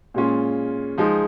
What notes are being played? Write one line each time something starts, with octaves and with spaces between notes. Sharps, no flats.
A#2 G#3 C#4 F4
F3 G#3 D#4